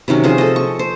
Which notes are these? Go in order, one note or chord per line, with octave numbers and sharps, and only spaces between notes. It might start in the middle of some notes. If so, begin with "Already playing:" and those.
C3 D#3 F#3 C#4
F3 G#4 C5
A4 D#5
C#6
C5